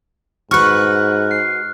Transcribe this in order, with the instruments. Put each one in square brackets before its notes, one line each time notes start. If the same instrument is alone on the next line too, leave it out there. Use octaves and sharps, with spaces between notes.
[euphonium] G#2 [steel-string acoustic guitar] F#4 B4 [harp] C#6 C#7 [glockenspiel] F6 F#6
[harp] C7